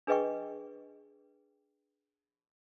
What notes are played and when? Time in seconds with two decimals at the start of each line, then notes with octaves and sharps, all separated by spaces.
0.07 D4 G#4 B4 D#5 G5 C#6